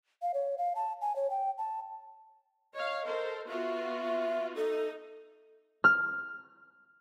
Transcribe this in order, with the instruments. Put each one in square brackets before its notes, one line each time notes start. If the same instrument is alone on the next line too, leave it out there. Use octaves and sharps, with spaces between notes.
[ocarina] F5
C#5
F5
A5
G#5
C#5
G5
A5
[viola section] C#5 F5 [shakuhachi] D#5
[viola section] A4 A#4 C5
[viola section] B3 F4 F#4 [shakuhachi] E5
[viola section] D#4 [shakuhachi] A4
[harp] F6